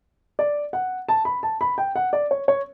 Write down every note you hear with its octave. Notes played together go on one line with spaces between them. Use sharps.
D5
F#5
A5
B5
A5
B5
G5
F#5
D5
C#5
C#5